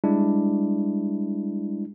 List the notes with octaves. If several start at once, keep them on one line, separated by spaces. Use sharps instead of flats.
G3 G#3 D4 E4